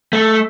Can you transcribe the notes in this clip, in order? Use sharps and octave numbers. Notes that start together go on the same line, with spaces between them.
A3